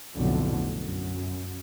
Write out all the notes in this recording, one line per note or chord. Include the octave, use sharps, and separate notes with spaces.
B1 F2 A2 D3
F#2